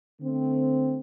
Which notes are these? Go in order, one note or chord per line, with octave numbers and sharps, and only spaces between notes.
D3 A3 C4